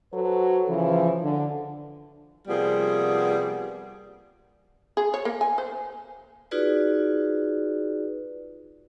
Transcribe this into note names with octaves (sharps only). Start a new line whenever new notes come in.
F#3 F#4 A4 B4 C5
C#3 E3 F3
D3
C3 F3 G3 A#3 B3 G#4
G#4
C#5
A#3
G#5
C5
D#4 F4 F#4 G#4 B4 D5